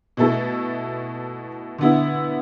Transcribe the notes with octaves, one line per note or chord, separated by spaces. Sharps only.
B2 A3 E4 A4
D3 B3 E4